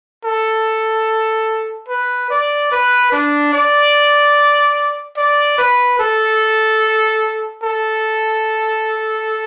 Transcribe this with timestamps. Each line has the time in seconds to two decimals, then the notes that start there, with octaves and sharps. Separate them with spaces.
0.24 A4
1.88 B4
2.30 D5
2.72 B4
3.12 D4
3.53 D5
5.17 D5
5.58 B4
5.99 A4
7.63 A4